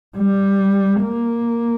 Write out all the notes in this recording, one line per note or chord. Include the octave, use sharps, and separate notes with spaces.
G3
A#3